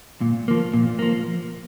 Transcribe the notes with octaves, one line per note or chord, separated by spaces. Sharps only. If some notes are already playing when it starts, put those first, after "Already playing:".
A#2
F3 A#3
A#2
F3 A#3